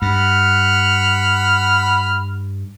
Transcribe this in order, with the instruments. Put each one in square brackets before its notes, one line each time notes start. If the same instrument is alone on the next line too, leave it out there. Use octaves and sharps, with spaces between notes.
[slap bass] G2 [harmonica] F#5 B5 F6